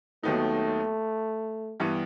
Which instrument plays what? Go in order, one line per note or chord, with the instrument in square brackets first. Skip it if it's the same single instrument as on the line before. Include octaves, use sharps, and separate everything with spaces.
[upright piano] D#2 D#3 F#3 B3 D#4 [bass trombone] A3
[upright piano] G2 E3 G3 B3